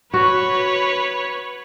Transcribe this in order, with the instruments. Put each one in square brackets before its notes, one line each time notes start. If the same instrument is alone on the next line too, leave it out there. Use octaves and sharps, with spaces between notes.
[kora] F#4 [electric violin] B4 C#5